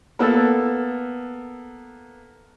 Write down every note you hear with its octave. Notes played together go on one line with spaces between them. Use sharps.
A#3 B3 A4 E6 A6